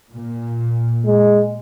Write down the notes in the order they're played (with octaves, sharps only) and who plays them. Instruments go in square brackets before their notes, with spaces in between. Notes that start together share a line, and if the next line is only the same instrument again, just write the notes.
[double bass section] A#2
[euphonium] G#3